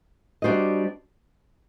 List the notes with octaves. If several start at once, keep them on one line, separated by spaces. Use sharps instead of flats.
G3 D4 F#4 C5 D#5